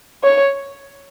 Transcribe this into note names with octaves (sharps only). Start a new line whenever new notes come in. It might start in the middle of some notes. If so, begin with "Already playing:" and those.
C#5